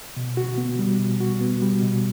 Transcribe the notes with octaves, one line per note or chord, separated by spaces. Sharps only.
B2
F#4
B3
G3
B2
F#4
B3
G3
B2